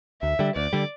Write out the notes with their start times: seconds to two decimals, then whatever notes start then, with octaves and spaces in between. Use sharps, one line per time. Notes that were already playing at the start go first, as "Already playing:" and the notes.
0.22 D2 E5
0.39 D3 G3
0.56 D2 D5
0.73 D3 G3